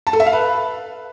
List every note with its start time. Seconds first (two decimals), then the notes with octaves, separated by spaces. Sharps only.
0.07 A5
0.13 A4
0.20 E5
0.26 F5
0.33 B4